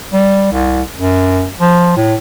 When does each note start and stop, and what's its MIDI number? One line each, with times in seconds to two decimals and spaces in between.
0.13 0.49 55
0.52 0.82 36
0.97 1.47 42
1.61 1.92 53
1.97 2.15 45